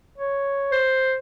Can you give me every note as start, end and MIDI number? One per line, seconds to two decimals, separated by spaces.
0.18 0.82 73
0.72 1.17 72